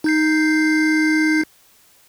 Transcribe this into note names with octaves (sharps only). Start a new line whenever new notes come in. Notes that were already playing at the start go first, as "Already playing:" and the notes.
D#4 G6 C7